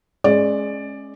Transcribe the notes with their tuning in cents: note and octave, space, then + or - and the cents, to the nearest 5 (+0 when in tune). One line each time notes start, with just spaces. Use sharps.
G#3 +15 C#4 -15 D5 +10